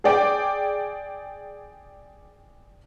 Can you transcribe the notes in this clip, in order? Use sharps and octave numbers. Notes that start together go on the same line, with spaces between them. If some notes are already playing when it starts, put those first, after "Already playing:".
G#4 D5 G5